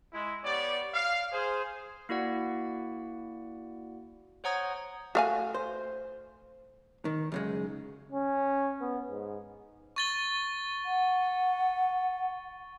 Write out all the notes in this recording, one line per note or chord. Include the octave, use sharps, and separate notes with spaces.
G#3 E4
B3 G4 C#5 D5
F5
G#4 C5
A#3 E4 F#4 D5 F#5
C5 C#5 F#5 A#5 D#6 G#6
A3 F#4 F5 G#5
C5
D#3
F#2 C#3 G#3
C#4
B3
G#2
C#6 A6 G7
F#5